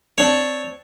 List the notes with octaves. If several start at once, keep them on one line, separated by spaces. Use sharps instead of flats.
C4 D4 C#5